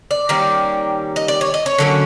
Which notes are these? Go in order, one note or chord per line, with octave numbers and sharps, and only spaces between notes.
D5
D#3 G3 A#3 C#4
D#5
D5
C#5
D#5
C#5
D3 F#3 A#3 C#4